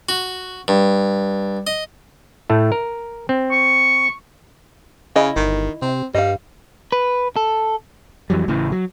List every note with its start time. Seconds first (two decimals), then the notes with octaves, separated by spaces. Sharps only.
0.09 F#4
0.68 G2
1.67 D#5
2.50 A2 A3
2.72 A#4
3.29 C4
3.51 C#6
5.16 C#3 E4 D#5
5.36 G1 D#3
5.82 C3 C4
6.14 G2 G3 D#5 F5
6.92 B4
7.36 A4
8.30 F2 E3 F#3 G3
8.48 A1 A2 C#3 E3
8.72 F#3